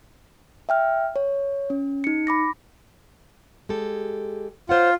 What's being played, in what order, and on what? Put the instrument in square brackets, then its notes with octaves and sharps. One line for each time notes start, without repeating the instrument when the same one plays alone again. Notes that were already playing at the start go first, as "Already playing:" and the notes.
[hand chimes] E5 G5 F6
C#5
C#4
D#4 C#7
B5 D6 A#6
[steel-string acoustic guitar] G#3 G4 A4
[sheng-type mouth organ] F4 [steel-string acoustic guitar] C5 C#5 F#5